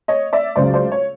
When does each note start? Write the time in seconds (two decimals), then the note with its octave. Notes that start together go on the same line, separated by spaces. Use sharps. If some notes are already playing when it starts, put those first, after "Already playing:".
0.08 C#5 D#5
0.33 D5 E5
0.56 C#2 C#3 F#3 C5 D5
0.73 C5 D5
0.92 C#5